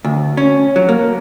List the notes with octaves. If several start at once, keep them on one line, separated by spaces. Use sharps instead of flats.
D2
C#4
F#3
A#3